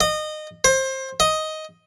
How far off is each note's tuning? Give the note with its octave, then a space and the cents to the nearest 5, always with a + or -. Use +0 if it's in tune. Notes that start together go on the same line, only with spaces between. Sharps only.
D#5 -25
C5 +25
D#5 +5